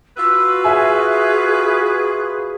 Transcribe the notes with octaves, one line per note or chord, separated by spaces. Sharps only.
F4 F#4 B4 E6
G#4 E5 G#5